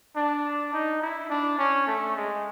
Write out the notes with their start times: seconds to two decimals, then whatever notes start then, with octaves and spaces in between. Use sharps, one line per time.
0.16 D4
0.73 D#4
1.02 E4
1.30 D4
1.58 C#4
1.87 A3
2.16 G#3